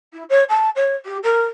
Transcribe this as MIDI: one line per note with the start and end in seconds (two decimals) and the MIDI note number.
0.13 0.23 64
0.29 0.43 73
0.49 0.70 81
0.75 0.94 73
1.05 1.17 67
1.23 1.43 70